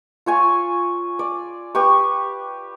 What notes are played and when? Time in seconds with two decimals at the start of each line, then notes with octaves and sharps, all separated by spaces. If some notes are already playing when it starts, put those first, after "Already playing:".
0.26 F4 C#5 G#5
1.19 D5
1.75 G4 B4 C#6